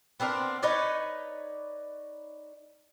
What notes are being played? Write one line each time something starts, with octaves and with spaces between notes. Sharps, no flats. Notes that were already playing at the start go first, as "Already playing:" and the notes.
B3 C4 D4 A#4
D#4 B4 C#5 D5